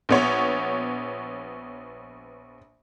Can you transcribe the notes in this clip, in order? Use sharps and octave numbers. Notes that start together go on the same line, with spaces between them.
A#1 B3 C#5